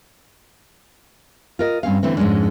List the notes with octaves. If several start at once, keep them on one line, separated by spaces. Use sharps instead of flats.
F4 A#4 D#5
G2 C4 C#4 F5
D3 E3 A3 C4
F2 G#2 G#3 C#4 D4